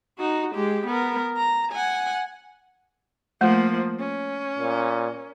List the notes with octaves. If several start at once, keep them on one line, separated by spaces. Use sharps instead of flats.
D#4 F#4
G#3 G4
B3 A#4
A#5
F#5 G#5
F3 A3 A#3
C#4
A#2